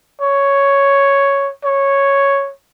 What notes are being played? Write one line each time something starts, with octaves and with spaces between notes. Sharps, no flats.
C#5
C#5